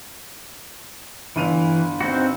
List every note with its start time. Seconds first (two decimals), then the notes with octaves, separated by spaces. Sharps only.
1.36 G1 E3 D#7 F7
2.01 C4 D#4 F#4